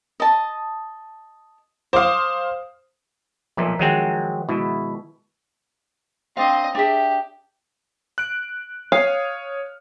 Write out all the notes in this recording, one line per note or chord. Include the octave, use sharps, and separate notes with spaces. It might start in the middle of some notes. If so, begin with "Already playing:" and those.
D#5 A5
C5 F5 D6 D#6
B1 A#2 F3 A#4 E5
D#3 F#3 G#3 C4 F#5
B2 G#3 E4 E5
C4 D4 D#5 F5
D4 G4 G#4 E5
F#6 D7
C#5 F5 D#6 F6